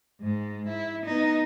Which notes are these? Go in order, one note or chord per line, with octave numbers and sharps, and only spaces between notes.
G#2 G#3
E4
B3 D#4